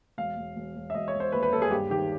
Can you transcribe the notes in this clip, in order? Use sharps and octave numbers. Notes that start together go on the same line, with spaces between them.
E1 F5
E1
E1
E1
E5
E1 D#5
C#5
E1
C5
D#2 B4
B4
D#2 A4
G#4
G2 G4
D#3 G4